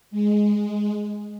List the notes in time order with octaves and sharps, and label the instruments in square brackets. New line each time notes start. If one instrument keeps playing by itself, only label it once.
[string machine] G#3